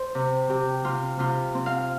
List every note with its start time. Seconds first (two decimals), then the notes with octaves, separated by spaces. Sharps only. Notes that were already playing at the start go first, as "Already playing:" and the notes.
Already playing: C5
0.15 C3
0.50 C3 G4
0.85 C3 F4
1.19 C3 F4
1.55 C4
1.66 F5